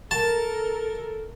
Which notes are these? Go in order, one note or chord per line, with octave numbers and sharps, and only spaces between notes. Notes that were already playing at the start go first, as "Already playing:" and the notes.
A4 A#4 A5